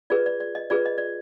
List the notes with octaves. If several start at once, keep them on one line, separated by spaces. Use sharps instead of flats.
F4 G#4 B4 D5
D5
D5
D#5
F4 G#4 B4 D5
D#5
D5